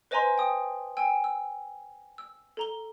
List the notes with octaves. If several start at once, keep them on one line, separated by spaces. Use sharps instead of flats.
B4 C5 D#5 G#5 A#5 C6
G5 D#6
G5 G#5 E6
E6
E6
A4 A#5 G7